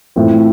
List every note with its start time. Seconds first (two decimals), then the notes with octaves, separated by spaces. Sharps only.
0.16 A2 E3 A3 C4 F4